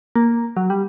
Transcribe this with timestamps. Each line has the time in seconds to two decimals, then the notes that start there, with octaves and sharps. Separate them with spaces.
0.15 A#3
0.57 F#3
0.70 G3